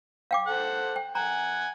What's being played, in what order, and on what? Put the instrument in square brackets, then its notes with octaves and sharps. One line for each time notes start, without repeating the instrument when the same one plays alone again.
[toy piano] F5 G5 D6
[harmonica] A4 C5 F#5
[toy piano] G5
[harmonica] F#5 G#5 [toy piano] A#5